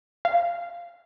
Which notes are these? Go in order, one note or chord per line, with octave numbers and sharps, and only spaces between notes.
F5